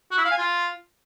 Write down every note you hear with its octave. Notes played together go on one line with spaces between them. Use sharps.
F#4
E4
F5
G#5
F4